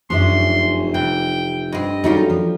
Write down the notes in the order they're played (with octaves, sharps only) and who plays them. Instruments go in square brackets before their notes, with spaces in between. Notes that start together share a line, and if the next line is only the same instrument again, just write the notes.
[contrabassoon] F1 [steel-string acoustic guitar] F#2 C#4 E5 [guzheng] D4 [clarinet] C6
[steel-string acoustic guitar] C3 [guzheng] E3 [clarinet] G5
[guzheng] G2 C4 [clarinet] D#5
[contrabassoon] F#2 [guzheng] G3 A3 A#3 [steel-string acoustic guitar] D#4 F4
[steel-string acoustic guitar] F3